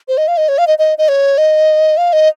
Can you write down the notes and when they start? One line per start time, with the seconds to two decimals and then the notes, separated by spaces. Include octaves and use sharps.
0.08 C5
0.18 D#5
0.28 F5
0.37 D#5
0.49 C#5
0.58 F5
0.67 D#5
0.79 D#5
0.98 D#5
1.09 C#5
1.38 D#5
1.97 F5
2.13 D#5